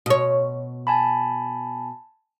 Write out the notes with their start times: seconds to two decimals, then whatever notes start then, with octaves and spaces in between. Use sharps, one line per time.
0.06 B2 C#5
0.87 G#5 A5 B5